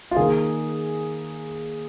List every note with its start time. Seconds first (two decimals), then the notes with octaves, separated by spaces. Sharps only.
0.11 F4
0.16 D#3 A#3 G#4